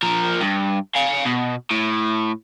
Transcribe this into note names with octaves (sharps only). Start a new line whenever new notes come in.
F3 A#4
G2
F5 G#5
B2
A2